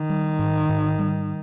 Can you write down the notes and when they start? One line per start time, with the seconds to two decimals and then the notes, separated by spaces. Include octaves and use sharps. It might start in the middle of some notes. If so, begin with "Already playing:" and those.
Already playing: D#3
0.10 G3
0.39 G#2
0.69 G#2
0.99 G3